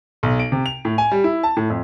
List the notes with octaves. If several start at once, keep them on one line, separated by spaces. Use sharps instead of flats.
B1
D7
C3
F7
A2
G#5
G3
E4
A5
A2
F2